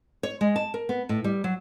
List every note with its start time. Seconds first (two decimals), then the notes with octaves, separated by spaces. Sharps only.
0.23 C#5
0.41 G#3
0.56 A5
0.74 A#4
0.89 B3
1.09 A2
1.24 G3
1.44 F#3